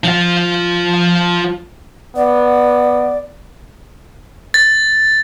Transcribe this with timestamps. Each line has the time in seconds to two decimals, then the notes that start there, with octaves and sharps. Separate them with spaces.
0.04 F3 F4
2.16 B3 D5
4.54 A6